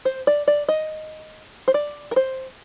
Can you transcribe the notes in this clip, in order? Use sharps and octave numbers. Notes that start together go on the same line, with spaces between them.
C5
D5
D5
D#5
C5
D5
A#4
C5